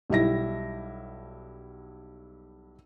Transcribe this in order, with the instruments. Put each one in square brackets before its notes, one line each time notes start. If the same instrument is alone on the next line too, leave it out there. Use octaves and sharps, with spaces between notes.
[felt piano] B1 G3 E4 A#6